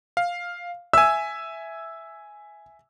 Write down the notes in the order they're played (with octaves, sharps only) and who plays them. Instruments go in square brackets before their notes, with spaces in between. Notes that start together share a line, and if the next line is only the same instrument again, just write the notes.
[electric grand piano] F5
[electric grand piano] E5 G#5 [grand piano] E6